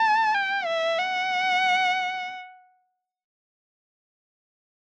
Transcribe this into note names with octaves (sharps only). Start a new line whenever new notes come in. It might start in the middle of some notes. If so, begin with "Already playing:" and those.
Already playing: A5
G5
E5
F#5